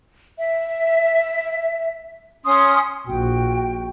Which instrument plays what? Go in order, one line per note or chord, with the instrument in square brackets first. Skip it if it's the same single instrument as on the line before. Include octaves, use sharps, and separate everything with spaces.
[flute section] E5
C#4 C6 D#6
[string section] A#1 [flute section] F#4 G5